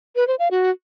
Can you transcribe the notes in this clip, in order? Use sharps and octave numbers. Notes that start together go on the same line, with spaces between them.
B4
C5
F5
F#4